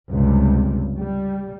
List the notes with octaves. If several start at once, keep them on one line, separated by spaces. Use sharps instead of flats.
C#2 G2 C3
G3